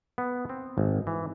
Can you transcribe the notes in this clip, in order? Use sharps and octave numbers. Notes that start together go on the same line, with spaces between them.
B3
C4
G#1
E3